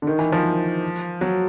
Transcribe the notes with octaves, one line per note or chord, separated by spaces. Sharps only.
D3
D#3
E3
F3
F#3